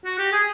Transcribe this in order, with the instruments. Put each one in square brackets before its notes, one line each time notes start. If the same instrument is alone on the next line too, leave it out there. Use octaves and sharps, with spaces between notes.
[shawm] F#4
G4
G#4